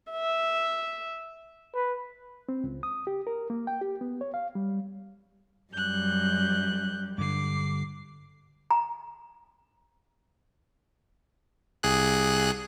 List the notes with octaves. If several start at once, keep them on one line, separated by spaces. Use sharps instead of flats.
E5
B4
C4
C#2
D#6
G4
A#4
A#3
G5
G4
B3
C#5
F5
G3
F#2 G3 F#6 G6
G2 D3 D6 C7
A#5
C2 G#4 F#6